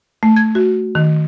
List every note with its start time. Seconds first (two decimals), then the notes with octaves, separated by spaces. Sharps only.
0.23 A3
0.36 G#6
0.55 F#4
0.95 D#3